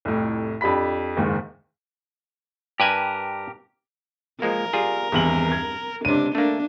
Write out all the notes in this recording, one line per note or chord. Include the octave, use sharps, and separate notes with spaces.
C2 F2 A2
F2 D4 G4 B5 B6
F#1 D#2 G#2 D#3
G2 G4 A#4 B4 G#5
F3 G#3 A#3 A#4
G3 F4 G#4
G#1 E2 G2 F#7
G#6
C#2 C3 D4 D#7
A3 A#3 D4